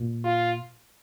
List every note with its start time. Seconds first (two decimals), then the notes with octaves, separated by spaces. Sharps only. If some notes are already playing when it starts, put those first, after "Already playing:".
Already playing: A#2
0.24 F4